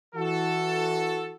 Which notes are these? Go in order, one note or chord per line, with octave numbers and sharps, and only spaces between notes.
E3 F#4 A4